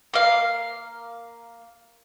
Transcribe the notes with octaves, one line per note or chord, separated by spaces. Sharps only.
A#3 F5